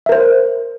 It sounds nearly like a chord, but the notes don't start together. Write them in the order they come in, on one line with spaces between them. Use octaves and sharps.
E5 A#4 C5